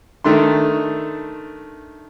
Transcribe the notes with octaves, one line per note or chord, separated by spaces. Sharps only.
D#3 A3 D4 C6